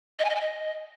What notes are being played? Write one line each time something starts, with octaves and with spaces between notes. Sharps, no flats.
D#5
G#5
D#5
G#5
D#5